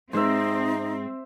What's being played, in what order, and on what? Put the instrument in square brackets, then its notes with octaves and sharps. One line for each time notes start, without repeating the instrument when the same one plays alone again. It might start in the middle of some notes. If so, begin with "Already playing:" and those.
[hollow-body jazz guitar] G#2 G#3 [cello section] C4 [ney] D#4 [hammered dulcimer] C5 E5